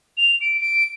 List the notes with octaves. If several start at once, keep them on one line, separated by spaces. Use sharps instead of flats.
F7
D7
D7